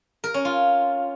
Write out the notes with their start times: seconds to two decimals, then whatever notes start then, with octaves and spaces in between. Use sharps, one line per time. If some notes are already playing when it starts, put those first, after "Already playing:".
0.24 A#4
0.34 C#4
0.45 F4